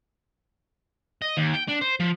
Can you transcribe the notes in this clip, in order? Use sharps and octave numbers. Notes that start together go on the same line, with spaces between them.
D#5
D#2
G5
D4
C5
F3